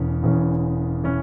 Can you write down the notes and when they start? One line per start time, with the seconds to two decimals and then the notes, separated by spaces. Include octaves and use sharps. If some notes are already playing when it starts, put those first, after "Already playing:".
Already playing: E1 E2 E3 C#4
0.23 E1 E2 E3 C#4
1.04 E3 C#4